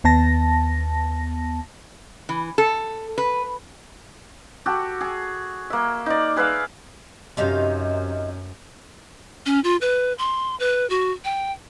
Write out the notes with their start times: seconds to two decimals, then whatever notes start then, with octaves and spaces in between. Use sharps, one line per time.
0.04 D#2 B3 A5 A#6
2.29 E3
2.58 A4
3.18 B4
4.66 F#4 G4 A4
5.01 G#4
5.70 A#3 E5
6.06 D#4 D5
6.36 G#4 B4 E5 F5
7.37 F#2 C3 D#4 F5
9.46 C#4
9.64 F4
9.81 B4
10.18 C6
10.60 B4
10.90 F#4
11.25 G5